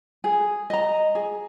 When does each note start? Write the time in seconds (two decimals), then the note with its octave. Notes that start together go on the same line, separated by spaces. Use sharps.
0.24 G#4
0.70 D#5 A#5
1.15 G#4